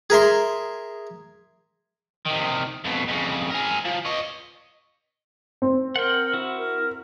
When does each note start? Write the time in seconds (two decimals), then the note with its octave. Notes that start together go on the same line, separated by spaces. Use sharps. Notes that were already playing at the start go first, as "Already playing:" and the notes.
0.10 G#4 A#4 E5 C6
2.25 C3 D#3
2.85 F2 B2
3.08 F2 C#3
3.50 G#4 A#4
3.85 F3
4.06 C#5 D#5
5.62 C4
5.96 A#4 F#5 G5
6.33 E4 F#4
6.57 A#4